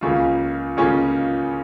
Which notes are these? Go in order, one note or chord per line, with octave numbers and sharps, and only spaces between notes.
C#2 C#3 A#3 C#4 F4
C#2 C#3 A#3 C#4 F4